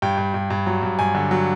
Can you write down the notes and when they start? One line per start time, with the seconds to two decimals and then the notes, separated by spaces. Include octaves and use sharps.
0.02 G2 G5
0.18 G2
0.34 G2
0.50 G2
0.66 F#3
0.83 G2
0.99 G2 G#5
1.15 D3
1.31 F#3